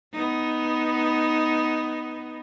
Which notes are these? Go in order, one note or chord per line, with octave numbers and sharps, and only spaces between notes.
B3 D#4